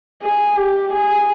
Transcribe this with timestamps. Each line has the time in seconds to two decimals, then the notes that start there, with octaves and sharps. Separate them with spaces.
0.22 G#4
0.57 G4
0.93 G#4